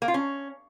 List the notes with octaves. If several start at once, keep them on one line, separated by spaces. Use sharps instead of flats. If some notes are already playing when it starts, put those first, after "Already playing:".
A#3
F4
C#4